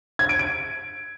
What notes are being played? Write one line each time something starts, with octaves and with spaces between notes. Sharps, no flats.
G#6
D7
D7